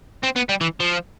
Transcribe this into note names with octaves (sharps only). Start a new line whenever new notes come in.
C4
B3
G3
E3
F3